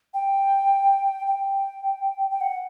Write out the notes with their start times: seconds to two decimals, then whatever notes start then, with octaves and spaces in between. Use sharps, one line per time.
0.14 G5
1.27 G5
2.31 G5
2.41 F#5